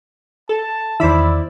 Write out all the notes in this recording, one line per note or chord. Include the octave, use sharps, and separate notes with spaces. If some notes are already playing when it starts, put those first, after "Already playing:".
A4 A5
E2 D#3 E4 C5 D5 B5 E6